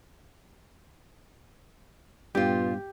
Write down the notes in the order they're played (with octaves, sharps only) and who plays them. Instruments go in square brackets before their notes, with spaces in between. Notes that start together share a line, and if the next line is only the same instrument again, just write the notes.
[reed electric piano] G2 [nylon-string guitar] A#2 F4 [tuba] B3 [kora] G4